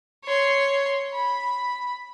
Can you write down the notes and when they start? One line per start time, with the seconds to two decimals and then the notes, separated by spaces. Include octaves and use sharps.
0.24 C#5 C6
1.13 B5